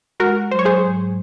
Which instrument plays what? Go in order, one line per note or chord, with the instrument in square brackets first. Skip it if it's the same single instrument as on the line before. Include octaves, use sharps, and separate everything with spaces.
[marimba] G#3 [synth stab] F#4 A#4
[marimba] F#3 [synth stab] C5
[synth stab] C#5
G#4 C5
[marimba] G#2